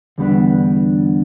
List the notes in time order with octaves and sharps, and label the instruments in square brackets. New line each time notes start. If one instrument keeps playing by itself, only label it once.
[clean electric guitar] E2 D3 G3 B3 D4